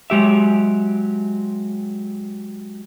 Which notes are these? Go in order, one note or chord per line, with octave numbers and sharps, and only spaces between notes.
F#3 G#3 G4 E5